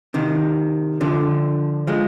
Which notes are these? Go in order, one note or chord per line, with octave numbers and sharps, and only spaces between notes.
C3 D#3
D3 F3
F3 G#3